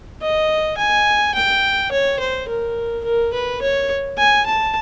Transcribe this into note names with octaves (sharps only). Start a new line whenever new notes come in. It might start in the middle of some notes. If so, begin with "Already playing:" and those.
D#5
G#5
G5
C#5
C5
A#4
A#4
B4
C#5
G#5
A5